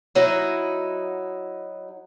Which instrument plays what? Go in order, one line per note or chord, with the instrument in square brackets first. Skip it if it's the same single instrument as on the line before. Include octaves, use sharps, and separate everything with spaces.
[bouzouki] F#3 D#4 E4